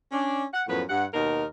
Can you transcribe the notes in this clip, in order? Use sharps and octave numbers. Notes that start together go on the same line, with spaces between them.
C#4 D4
F#5
F#2 A2 F3 B3 B4
G2 F#5
D#2 B2 D#4 A#4